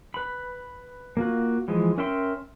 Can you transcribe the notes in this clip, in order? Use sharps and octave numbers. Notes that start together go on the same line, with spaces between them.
B4 B5
A#3 F4 F#4
E3 F3 G#3
C#4 A#4 E5 G5 C6